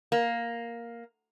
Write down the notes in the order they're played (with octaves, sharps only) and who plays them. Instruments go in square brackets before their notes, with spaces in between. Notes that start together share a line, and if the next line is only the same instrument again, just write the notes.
[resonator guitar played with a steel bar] A#3